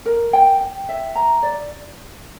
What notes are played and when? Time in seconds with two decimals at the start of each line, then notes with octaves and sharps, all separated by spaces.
0.06 A#4
0.33 G5
0.61 G5
0.89 E5
1.15 A#5
1.42 D5